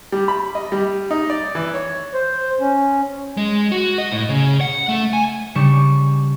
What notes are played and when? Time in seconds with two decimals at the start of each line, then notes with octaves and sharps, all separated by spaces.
0.12 G3
0.28 B5
0.55 D#5
0.72 G3
1.11 D#4
1.30 D5
1.55 E3
1.74 C#5
2.14 C5
2.61 C#4
3.37 G#3
3.72 F#4
3.98 D#5
4.12 A2
4.29 C#3
4.61 F#5
4.89 A3
5.13 G#5
5.55 C#3 G3 D4 C#6 E7